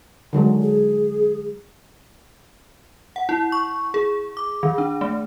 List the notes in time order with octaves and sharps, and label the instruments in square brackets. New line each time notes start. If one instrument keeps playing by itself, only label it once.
[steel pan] D3 F#3 G#3
[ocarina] G#4
[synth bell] F#5
E4
C#6
G#4
D6
D#3
D4
A3